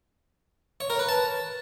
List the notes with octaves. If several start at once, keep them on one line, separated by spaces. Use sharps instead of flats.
C#5
A#4
B4
A5